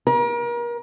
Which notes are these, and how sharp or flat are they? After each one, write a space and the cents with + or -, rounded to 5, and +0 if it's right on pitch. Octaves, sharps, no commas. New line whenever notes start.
A#4 +35